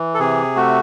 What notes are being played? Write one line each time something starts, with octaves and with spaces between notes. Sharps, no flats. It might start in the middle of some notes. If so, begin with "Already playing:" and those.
Already playing: E3
A4
C3 G#4
A3 F#4